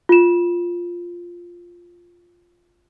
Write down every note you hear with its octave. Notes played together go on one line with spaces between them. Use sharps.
F4 E7